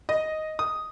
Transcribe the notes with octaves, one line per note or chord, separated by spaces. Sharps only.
D#5
D#6